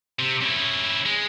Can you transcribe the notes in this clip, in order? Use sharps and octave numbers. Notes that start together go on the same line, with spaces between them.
C3
C#3 E4
G#3